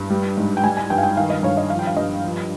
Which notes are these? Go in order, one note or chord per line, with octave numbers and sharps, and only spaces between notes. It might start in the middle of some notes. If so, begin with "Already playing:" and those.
Already playing: G2
G3
G#2
G5
G3 G#5
G#5
G2 G5
F5
G5
D#3 F5
D#5
G2 C#5
D#5
F3 F5
G5
F5
G2 D#5
F3